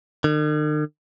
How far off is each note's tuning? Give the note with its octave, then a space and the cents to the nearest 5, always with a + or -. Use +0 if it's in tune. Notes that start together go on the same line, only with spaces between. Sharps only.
D#3 -45